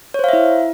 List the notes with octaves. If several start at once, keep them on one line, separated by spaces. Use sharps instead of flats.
E4 C5 C#5 E5 F5